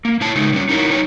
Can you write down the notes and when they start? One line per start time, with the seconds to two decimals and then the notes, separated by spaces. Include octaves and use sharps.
0.05 A#3
0.21 A#2 E4 C#5 A5
0.35 C#3 G#3 A3 D#4
0.53 A2 G3 C#4
0.69 D#4 E4 F#4 A#4 C#5
0.91 F#3 D#4 C#5